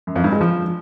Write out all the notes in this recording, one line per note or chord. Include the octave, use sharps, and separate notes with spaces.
F#2
F2
G2
G#3
F3